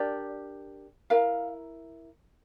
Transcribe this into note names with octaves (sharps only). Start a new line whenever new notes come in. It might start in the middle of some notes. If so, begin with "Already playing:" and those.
Already playing: D4 G4 A#4 D5
E4 A#4 F5